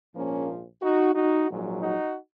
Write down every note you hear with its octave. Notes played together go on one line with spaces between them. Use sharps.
A#1 G#2 F3 A#3 C#4
D#4 F#4
D#4 F#4
A#1 G#2 F#3
D#4 F#4